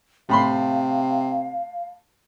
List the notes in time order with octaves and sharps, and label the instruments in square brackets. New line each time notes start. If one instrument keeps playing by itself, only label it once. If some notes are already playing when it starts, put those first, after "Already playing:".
[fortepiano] A2 B5 C6 [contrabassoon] C3 [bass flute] F5